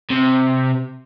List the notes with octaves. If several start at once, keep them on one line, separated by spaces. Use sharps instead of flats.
C3